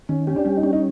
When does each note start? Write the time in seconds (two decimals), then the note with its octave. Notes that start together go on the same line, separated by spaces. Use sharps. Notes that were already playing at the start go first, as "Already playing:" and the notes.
0.09 D#3 C#4
0.27 C#4 G4
0.36 D4
0.44 G3 C#4
0.57 D#4
0.63 C#4 D4
0.73 D#4